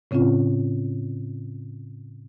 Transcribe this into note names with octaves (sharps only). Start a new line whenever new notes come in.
A2 C#3 C4 C#4 F4